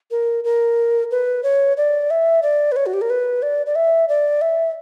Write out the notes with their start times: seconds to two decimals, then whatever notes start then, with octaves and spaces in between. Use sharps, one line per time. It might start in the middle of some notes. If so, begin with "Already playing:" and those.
0.11 A#4
0.44 A#4
1.11 B4
1.43 C#5
1.77 D5
2.10 E5
2.43 D5
2.72 B4
2.76 C#5
2.86 F#4
2.93 G4
3.01 A#4
3.10 B4
3.42 D5
3.66 D5
3.75 E5
4.09 D5
4.41 E5